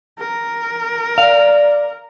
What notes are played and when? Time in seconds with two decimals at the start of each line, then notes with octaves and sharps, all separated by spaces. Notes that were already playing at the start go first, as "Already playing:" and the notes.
0.19 A#4
1.18 D5 F5